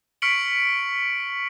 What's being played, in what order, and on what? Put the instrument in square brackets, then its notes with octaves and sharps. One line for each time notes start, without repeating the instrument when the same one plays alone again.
[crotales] C#6 F6 B6 C#7 D7 F#7